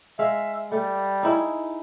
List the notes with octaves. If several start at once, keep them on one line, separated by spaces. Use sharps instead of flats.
G#3 E5 F5
G3 A3
D#4 E4 G#4